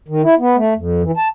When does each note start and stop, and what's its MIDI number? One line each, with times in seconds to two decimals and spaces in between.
0.08 0.22 51
0.23 0.35 64
0.39 0.56 59
0.56 0.74 57
0.76 1.02 41
1.03 1.11 52
1.17 1.28 81